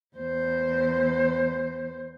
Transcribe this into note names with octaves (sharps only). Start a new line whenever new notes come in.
E2 C5